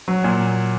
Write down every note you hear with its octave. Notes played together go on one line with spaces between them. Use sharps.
F#3
A#2